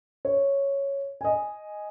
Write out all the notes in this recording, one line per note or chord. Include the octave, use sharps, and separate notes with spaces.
C#5
D#5 G#5